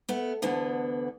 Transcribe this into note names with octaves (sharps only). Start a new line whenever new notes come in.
A3 B3
D2 D3 E3 B3